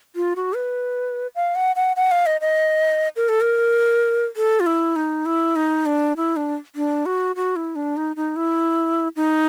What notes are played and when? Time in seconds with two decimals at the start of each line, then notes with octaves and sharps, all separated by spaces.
0.16 F4
0.36 F#4
0.55 B4
1.35 F5
1.55 F#5
1.76 F#5
1.96 F#5
2.11 F5
2.26 D#5
2.41 D#5
3.16 A#4
3.29 A4
3.41 A#4
4.37 A4
4.60 F4
4.66 E4
4.96 D#4
5.26 E4
5.56 D#4
5.86 D4
6.17 E4
6.36 D4
6.76 D4
7.06 F#4
7.36 F#4
7.56 E4
7.76 D4
7.97 D#4
8.16 D#4
8.36 E4
9.16 D#4